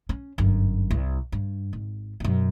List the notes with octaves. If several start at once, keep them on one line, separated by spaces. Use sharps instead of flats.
C#4
G1 F#2
C2
G2
G#1
F#2 B2